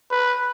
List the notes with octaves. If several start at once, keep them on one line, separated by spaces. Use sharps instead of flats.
B4